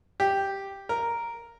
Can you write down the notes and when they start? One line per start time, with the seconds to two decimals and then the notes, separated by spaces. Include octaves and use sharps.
0.20 G4
0.89 A#4